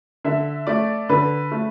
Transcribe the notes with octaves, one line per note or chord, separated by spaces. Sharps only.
D3 E5
A3 D5
D3 B4
A3